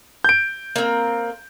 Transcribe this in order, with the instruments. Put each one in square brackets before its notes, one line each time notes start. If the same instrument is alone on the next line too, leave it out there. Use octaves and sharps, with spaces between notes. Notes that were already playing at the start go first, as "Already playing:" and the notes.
[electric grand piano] G6 D7
[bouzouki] A#3 C4